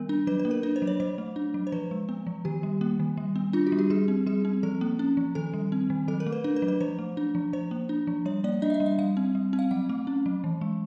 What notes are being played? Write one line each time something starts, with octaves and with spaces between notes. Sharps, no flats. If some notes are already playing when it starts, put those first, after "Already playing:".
Already playing: D#3 G3 B3 A#4
D4
F#3 B4
B4
A#3
A#4
D4 B4
C5
F#3
C#5
F#3 C5
A3
D4
F#3
C5
F3 B4
G#3
B3
F3
D#3 G4
G3
A#3
D#3
G3
B3
D4 F4
F#4
G3
G4
G3 G#4
C4
G3 G#4
C4
F3 A4
A#3
C#4
F3
D#3 A4
G3
C4
D#3
F#3 A4
A#4
A3
B4
D4 A#4
B4
F#3
B4
F3 C5
A3
D4
F3
F3 C5
A#3
D4
F3
G3 C#5
A#3 D5
D4 D#5
E5
D#5
G3
E5
G3 F5
C4
G3
C4
F5
F#3 F#5
A3
C#4
F#3
E3
G#3